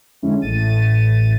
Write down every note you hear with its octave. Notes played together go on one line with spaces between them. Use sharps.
F2 D3 G#3 C#4 E4
A1 A2 A6 D#7